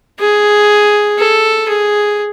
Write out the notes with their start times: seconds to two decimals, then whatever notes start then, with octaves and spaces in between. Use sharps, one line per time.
0.20 G#4
1.19 A4
1.69 G#4